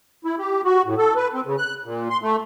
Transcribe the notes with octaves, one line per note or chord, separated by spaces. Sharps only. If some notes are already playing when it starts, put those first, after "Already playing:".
E4
G4
F#4
A2
A4
B4
C4
C#3
F#6
A#2
C6
A3